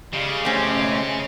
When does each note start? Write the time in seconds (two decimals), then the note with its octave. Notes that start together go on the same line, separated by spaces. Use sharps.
0.14 C#3 G3 G#3 F5
0.45 A3 C4 C#4 G4